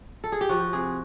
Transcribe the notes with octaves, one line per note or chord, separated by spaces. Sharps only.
A4
G#4
G4
F3 F#4
C3 G#4